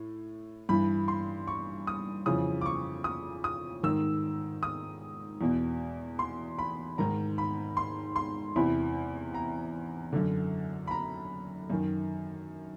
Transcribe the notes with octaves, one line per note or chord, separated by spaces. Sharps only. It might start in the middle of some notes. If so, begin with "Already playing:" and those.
Already playing: A2
G2 E3 B5
C6
C#6
D#6
F2 C#3 E3 D#6
D6
C#6
D#6
D#6
G#2 D#3 E6
D#6
E2 B2
C6
B5
G#2 D#3 A#5
B5
C6
C6
E2 C3 E3 B5
A#5
F#2 D3
B5
A#5
F#2 D#3